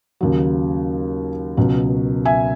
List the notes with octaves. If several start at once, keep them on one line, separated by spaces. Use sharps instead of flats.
D#2 C#3 F#3
C#2 B2 F#3
E5 G#5